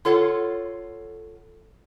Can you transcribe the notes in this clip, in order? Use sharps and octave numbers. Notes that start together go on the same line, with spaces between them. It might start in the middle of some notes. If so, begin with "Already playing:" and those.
F4 A4 C#5 F#5